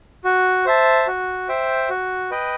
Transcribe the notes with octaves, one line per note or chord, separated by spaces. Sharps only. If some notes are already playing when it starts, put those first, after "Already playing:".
F#4
C5 E5 A5
F#4
C5 E5 G5
F#4
B4 D#5 G5